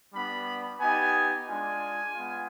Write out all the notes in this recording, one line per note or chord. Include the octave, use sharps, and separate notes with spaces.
G3 B3 D4 B5
B3 D#4 G4 G#5
G#3 D4 F4 G#5
G#3 B3 F4